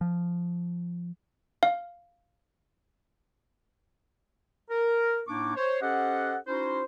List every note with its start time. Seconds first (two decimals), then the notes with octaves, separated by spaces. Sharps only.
0.01 F3
1.63 F5
4.70 A#4
5.28 A2 A#3 D4 D#4 C#6 D6
5.56 C5 C#5
5.82 C#4 G4 A4 C5 D#5 F#5
6.47 C#4 D#4 E4 F#4 C5